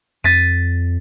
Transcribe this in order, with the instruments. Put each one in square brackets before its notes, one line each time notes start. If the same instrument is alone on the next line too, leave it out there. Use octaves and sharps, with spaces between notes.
[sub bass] F2 [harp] A6 B6 D#7